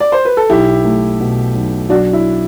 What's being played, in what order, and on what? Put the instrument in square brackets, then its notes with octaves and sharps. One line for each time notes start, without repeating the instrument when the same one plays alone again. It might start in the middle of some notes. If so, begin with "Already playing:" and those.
[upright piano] D5
C5
B4
A4
[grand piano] B1 [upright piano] E4 G4
[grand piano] A3
B2
B1
[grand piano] F#3 [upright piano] D4 F#4
[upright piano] E4